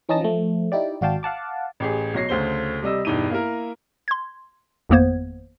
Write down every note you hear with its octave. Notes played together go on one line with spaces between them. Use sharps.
E3 C#4 D#4 D#5 A5 A#6
F3 A3
D#4 E4 G4 D5
G#1 F#4 D5 F5 G5 A5
F5 F#5 A5 D6
A1 G4 G#4
B1 F#3 C#5 A#6 C7
D2 C#3 C5 G7
C3 G3 D#5 E6
E1 G2 D#4 E4 D#7
A#3 E4 A#4
C6 G#6
G#1 F2 A#3 B3 C5 G#6